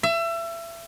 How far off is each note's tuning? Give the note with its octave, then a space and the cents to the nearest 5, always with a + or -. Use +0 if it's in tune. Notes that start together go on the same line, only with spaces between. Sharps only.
E5 +30